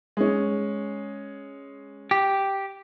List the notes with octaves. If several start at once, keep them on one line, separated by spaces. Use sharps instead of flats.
G#3 C#4
G4